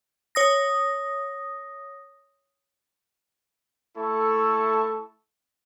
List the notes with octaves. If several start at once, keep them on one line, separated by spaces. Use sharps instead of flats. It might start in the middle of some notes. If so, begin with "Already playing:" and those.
C#5 D#6 A#6
A3 E4 A4 C#6